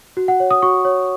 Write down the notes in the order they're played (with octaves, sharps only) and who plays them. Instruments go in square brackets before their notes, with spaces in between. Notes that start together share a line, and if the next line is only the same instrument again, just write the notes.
[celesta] F#4
F#5
C#5
D#6
F#4 C#6
C#5